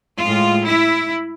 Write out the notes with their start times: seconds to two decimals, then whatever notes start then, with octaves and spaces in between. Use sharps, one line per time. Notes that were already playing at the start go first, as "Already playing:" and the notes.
0.18 A2 G#3 F4
0.67 E4